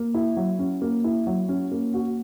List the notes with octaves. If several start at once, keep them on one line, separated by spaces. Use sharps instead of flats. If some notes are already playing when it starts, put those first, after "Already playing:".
Already playing: A#3
E4
F#3
C#4
A#3
E4
F#3
C#4
A#3
F#4